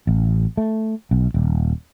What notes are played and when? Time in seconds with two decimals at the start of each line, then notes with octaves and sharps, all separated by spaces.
0.07 A1
0.57 A3
1.11 B1
1.34 D#1